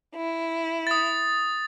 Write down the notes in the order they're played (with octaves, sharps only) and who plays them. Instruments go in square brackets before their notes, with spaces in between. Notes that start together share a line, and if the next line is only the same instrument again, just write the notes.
[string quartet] E4
[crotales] D#6 A6